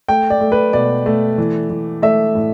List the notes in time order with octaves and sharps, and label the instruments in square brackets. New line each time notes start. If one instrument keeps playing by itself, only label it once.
[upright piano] A3 G5
D5
A3
B4
B2 D5
A3
E3
E3
A3 E5
A2